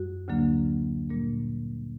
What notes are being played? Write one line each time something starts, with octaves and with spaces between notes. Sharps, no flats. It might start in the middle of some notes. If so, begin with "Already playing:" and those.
Already playing: F#2 G3 F#4
D2 D3 F#3 A#3 D4
A#2 G3 A#3